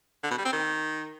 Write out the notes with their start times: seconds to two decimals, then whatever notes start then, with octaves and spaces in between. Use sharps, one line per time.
0.24 D3
0.31 B2
0.38 G3
0.45 C4
0.53 D#3